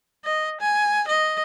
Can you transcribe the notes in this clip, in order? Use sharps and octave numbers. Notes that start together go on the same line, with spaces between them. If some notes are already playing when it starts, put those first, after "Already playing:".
D#5
G#5
D#5